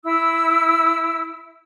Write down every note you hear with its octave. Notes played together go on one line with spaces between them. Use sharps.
E4 E6